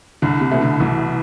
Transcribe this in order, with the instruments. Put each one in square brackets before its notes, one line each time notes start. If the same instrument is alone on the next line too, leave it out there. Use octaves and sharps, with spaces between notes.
[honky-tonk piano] C2 [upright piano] D3
[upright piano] C3
[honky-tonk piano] B2 A3
[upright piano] D3
[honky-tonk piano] C2 [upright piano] E3